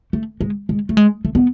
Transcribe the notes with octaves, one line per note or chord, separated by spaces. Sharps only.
A3
G#3
G#3
A3
G#3
A3
B3